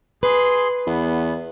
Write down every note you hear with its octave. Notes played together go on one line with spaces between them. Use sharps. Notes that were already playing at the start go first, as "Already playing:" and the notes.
G#4 B4 C6
E2 B3